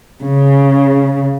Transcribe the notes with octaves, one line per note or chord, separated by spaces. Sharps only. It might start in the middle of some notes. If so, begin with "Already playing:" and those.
C#3